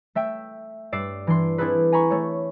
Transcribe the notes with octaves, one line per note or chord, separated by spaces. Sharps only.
A3 E5 G5
G2 D5 E6 C7 E7
E3 D4 C6
C4 D4 E4 G#4 A4 B4
G#5 A#5 B5 C#6
A3 C#5